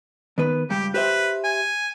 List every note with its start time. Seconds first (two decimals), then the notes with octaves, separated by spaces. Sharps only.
0.38 D#3 B3 B4
0.70 C#2 G2 G3 G4
0.94 G4 B4 C5 E5
1.44 G#5